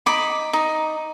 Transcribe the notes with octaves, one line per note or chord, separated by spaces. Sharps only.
D#4 B5 D6
D#4